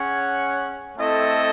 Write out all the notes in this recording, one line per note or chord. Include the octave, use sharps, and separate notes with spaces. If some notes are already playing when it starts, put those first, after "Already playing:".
Already playing: C#4 G#4 C#5 F#5
A3 C4 E4 A4 D#5